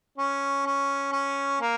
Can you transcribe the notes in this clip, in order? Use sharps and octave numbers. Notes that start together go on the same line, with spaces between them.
C#4
C#4
C#4
A#3